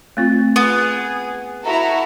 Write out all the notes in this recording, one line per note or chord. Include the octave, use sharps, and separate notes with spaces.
A3 C4 F4
B3 G#4
E4 F#4 A4 A#5